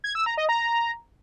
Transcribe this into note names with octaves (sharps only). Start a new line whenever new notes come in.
G#6
E6
A#5
D#5
A#5